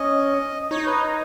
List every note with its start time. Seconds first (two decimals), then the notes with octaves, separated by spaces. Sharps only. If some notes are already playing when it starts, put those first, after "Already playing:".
Already playing: C#4 D#5
0.71 D#4 C#5
0.86 B4